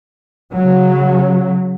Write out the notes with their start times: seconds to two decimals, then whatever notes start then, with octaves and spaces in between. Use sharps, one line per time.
0.53 C#3 F#3